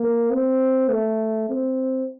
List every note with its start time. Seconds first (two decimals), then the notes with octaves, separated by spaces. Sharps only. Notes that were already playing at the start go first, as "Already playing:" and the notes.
Already playing: A#3
0.31 C4
0.89 A3
1.50 C4